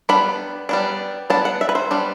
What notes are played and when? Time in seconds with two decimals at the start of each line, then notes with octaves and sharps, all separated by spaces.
0.09 G3 B3 D4 B5
0.69 G3 B3 D4
1.30 G3 B3 D4 A5
1.45 F#5
1.61 E5
1.69 B4
1.75 C5
1.91 G3 B3 D4